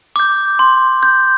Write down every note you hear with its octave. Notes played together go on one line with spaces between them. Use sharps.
D6 G6
C6
G6